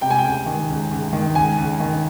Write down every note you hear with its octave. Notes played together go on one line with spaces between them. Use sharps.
C3 G5
G#5
G5
C#2
D#3
C#2
C#2
D#3
C#2 G#5
C#2
D#3